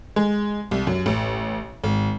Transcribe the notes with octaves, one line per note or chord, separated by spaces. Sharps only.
G#3
C2
F#2
A1
G#1